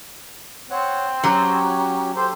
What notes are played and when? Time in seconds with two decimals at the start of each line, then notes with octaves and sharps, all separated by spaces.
0.70 C4 C#5 F#5
1.24 F#3 C#4 F#4 G4
2.16 G4 A4 C5